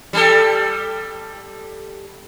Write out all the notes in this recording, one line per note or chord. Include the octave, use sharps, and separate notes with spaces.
G3 G4 A4